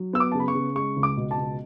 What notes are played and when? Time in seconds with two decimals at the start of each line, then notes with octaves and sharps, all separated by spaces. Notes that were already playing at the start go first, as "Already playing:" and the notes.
Already playing: F#3
0.13 B3 E6
0.20 D6
0.32 C#3 A5
0.40 B5
0.48 C#6
0.55 C#3
0.75 G#3 C#6
0.96 C#2
1.03 D6
1.17 B2
1.31 A5
1.37 C#2